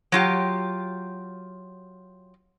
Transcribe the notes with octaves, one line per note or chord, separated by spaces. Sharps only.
F#3 F4 G4 G5